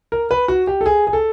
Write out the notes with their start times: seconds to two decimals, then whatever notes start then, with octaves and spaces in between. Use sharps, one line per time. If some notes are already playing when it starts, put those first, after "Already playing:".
0.12 A#4
0.31 B4
0.48 F#4
0.67 G4
0.81 A4
0.86 G#4
1.07 G#4
1.13 A4